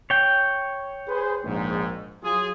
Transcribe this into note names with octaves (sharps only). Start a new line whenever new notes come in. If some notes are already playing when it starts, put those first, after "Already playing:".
C#5 G5
G#4 B4 C5
A#1 G#2
F#3 F4 G#4